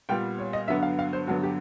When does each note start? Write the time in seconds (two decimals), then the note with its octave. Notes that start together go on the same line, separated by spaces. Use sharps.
0.09 A#2 G3 B3 G5
0.38 C#5
0.53 D#5
0.68 G2 D3 F#3 B3 E5
0.83 F5
0.99 F5
1.13 C5
1.27 G2 D3 F#3 B3 F#4
1.43 G4